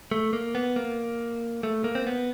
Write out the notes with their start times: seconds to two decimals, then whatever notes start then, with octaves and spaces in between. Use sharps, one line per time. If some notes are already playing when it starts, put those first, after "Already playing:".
0.12 A3
0.33 A#3
0.55 B3
0.76 A#3
1.63 A3
1.84 A#3
1.95 C4
2.07 B3